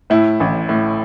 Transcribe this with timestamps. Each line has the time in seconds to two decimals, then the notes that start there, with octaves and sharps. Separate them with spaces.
0.10 A2 E4
0.40 A1
0.69 A2